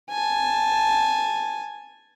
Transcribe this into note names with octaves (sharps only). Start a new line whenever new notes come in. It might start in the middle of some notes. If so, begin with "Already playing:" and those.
G#5 A5